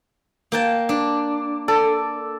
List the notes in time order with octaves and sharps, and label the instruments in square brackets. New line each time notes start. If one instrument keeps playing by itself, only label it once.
[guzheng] A#3 G5 A5
D4
[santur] A4 [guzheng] D5